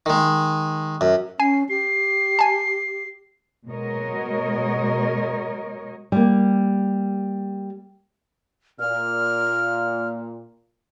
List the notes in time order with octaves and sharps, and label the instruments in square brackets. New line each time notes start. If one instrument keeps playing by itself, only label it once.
[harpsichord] D#3 G#3
F#2
[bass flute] C#4 [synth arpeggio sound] G#5 [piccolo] C7
[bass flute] G4 [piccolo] C7
[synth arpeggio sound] G#5 A5
[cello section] B2 G#3 F#4 A#4 C#5 D#5
[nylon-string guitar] G3 A#3
[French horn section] A#2 [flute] F6